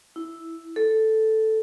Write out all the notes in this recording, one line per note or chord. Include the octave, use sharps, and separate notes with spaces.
E4
A4